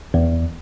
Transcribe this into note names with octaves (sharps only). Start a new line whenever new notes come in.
E2